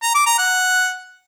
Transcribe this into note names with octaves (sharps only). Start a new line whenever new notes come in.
A#5
D6
A#5
F#5